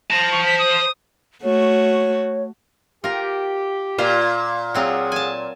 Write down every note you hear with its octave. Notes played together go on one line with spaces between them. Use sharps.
C5 A5 A#6
C#6
B6
D#6
A3 F#4 C#5
F4 G4 A#4
A#2 F4 C5
F#3 C4 F4 G#4 F#5
G#5 A5